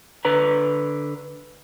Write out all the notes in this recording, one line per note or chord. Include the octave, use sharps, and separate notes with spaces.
D3 B4 A#5